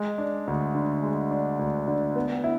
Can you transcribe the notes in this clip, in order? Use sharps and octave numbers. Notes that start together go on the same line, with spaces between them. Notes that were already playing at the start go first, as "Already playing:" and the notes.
Already playing: G#3
D4
D2
D3
G#3
D4
D2
D3
B3
E4